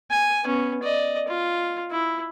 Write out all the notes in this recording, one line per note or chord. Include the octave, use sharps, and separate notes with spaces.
G#5
B3 C#4
D5 D#5
F4
E4